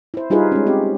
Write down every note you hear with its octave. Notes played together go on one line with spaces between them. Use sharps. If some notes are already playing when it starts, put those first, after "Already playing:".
E4 C5
G3 D#4 F4 G#4 B4
G#3 C#4
C4 G4